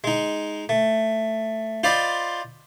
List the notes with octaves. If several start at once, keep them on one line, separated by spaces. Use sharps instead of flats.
G#3 D#4
A3
F4 C5 D5 D#5 B5